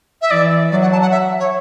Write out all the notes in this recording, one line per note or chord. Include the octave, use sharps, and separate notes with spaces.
E5
E3 D5
F#3 D5
F#5
A5
F#5
E5
C#5